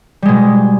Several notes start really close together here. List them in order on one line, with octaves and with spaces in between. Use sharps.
G3 G#3 B2